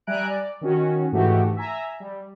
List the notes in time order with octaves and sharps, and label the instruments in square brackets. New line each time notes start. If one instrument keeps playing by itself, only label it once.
[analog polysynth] G3 E5 G#5 A#5 F#6 D7
D5
D#3 C#4 F#4
G#2 E3 A3 F#4 G4
E5 G#5 A#5
G3